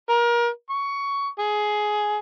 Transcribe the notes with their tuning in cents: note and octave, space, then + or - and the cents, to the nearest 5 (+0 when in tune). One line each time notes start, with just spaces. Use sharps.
A#4 +30
C#6 +15
G#4 +15